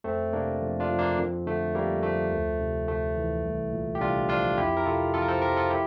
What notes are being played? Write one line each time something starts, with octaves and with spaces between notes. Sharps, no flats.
F2 A3 C4
C3 A#3 D4
F2
D4 F4
F3
A#3 D4
F2
D3 A3
F2 G3 A#3
F3 A3
D2
C3
D2 A3
E3
C2
A#2
G4
C2 D4 F4
F3 D4 F4
F2 E4 G4
A#4
C3 F4 A4
F2 F4 A4
A#4
A4 C5
F3 G4 A#4
F4 A4
E4 G4